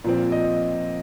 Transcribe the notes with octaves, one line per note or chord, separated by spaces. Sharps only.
A#2 F3 C4
D#5